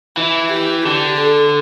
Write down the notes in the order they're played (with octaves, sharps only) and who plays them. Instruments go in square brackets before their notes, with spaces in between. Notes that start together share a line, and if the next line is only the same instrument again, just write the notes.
[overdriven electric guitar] E3 [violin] E4
[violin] G4
[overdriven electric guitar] D3 [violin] G4
[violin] A4